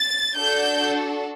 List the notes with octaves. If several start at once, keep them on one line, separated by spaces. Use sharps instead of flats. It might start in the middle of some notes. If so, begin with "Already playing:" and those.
Already playing: A6
D4 F#4 A4 G6